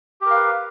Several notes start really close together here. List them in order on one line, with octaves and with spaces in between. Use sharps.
G4 A#4 F5 B4